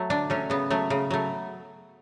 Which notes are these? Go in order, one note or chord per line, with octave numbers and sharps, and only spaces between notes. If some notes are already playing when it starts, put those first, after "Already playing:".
Already playing: F#3 A3
D3 D4
F#3 A3 C#4
C#3 B3
F#3 A3
C#3
F#3 A3